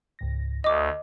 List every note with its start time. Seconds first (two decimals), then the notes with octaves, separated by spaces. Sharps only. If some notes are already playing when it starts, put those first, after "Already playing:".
0.19 C#2 G#2 A#6
0.64 D2 D#5 D6 D#6